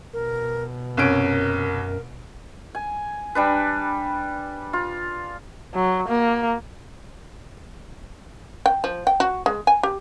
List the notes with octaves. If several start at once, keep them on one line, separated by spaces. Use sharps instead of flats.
B2 A#4
C2 F#2 C#4 A#4 D7
G#5
G3 D4 B4
F4
F#3
A#3
G5
F3
G5
F#4
G#3
G#5
G4